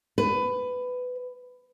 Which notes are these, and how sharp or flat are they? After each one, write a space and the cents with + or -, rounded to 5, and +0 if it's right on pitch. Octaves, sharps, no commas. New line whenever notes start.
B4 +15